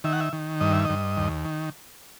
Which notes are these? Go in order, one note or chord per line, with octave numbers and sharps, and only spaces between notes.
D#3 E5
F#5
E5
D#3
G2 D#5
E5
G2 D#5
D#2
D#3